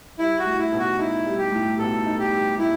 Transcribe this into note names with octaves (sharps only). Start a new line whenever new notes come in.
G3 E4
F#4
A2
E4
B1
F#4
D#4 E4
G3
G4
A2
B1 A4
D#4
G4
G3
A2 E4